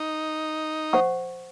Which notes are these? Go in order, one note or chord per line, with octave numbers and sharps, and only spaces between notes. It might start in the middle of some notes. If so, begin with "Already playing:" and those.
Already playing: D#4
C5 F#5 C#6